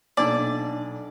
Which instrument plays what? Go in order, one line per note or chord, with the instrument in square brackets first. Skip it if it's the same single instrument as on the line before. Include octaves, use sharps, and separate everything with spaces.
[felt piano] B1 A#2 [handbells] D4 G#5 [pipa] D5